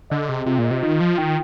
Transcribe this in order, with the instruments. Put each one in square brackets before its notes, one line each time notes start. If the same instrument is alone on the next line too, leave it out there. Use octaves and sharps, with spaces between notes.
[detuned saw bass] D3 [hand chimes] D#5
[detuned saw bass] C3 [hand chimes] G#4
[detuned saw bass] C3 [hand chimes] F4
[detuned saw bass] A#2
[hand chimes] D#5
[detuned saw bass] C3
[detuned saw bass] D#3 [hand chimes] F4
[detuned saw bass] F3 [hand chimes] F4
[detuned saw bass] D#3 [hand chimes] G5